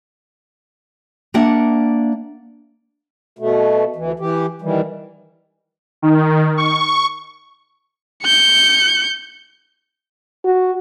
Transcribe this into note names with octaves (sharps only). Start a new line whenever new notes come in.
A#3 D4 E5 F#5
B2 A3
D2 E3
E3 G4
D#3 E3 G3
D#3
C#6
G6 C#7
F#4